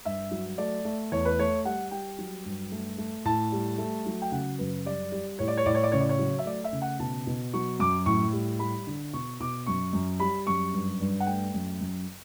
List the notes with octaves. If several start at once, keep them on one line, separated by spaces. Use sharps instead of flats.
G2 E5
F#3
A3 D5
A3
E2 C#5
B4
A3 C#5
G3 F#5
G3 G5
F#3
G2
A3
A3
A2 A5
G3
A3
F#3
G5
C#3 F#5
F#2 B4
G3 D5
G3
A2 C#5
D5
C#5
A2 D5
C#5
D5
C#3 C#5
D5
C#5
F#3
E5
A3 D5
E5
C#3
F#5
B2 A5
B2
F#3 C#6
F#2 D6
A2 C#6
G3
G3 B5
D3
B2 C#6
B2 D6
F#2 C#6
F#2
G3 B5
F#2 C#6
G2
G2
F#5
A3 G5
F#2
F#2